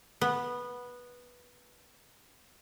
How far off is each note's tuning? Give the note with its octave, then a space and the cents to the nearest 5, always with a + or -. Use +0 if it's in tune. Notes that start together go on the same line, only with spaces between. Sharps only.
B3 -10